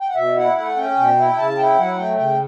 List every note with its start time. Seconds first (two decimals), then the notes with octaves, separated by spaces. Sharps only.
0.01 G5
0.08 F#5
0.15 B2 E5
0.36 E4 F#5
0.56 A3 F#5
0.77 C#4 G5
0.96 B2
1.17 E4
1.37 C#3 A5
1.57 E4 G5
1.77 F#3 F#5
1.98 A3 G5
2.18 C#3 G5